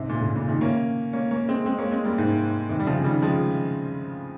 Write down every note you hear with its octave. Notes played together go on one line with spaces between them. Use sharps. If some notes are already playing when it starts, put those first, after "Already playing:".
Already playing: G#2 C3
A#2 C#3
A#2 C#3
A#2 C#3
C3 D#3
A#3 C#4
A#3 C#4
A#3 C#4
G#3 C4
G#3 C4
A#3 C#4
G#3 C4
G3 A#3
G#2 C3
C3 D#3
G3
C#3 F3
D#3 G3
F3 G#3